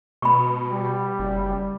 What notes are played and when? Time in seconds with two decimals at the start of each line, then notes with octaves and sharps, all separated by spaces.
0.22 B2 B5 C#6
0.70 G3
1.19 F#1